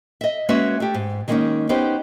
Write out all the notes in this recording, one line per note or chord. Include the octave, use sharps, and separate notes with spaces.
D#5 E5
G#3 A#3 C#4 F#4 B4 E5
A3 G4
G#2
D#3 G#3 A#3 C4 C#4 D#4
B3 C#4 D#4 G4 C5